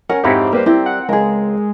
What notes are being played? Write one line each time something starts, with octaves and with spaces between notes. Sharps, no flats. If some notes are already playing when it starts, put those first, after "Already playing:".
C#4 A#4 F#5
F2 G#2 C4 D#4 E4 G4 C#5
G3 A#3 B4 C5
C4 E4 G4 A#4
F#5
C#2 G#3 G#4 A#4